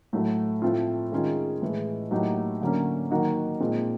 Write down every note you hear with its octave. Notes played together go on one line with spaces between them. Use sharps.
A2 F#3 A3
A2 F3 A3 C4 F4
D#3 G#3 C#4 F4 G#4
A2 E3 G#3
A2 F#3 A#3 D#4 G4
D3 F#3 A#3 C#4
D#3 F#3 A#3 D#4 F#4
A#2 F3 G#3 C4 D#4